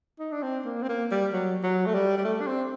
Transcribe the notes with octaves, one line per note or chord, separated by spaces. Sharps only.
D#4
D4
C4
A#3
C4
A#3
G3
F#3
F#3
A3
G3
G3
A3
D4
C4